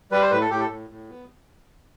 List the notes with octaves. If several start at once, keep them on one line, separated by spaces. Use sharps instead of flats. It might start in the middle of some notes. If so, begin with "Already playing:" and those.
G3 B4
C5
A2 B4
A4
A2 G4
A4
A2
A2
B3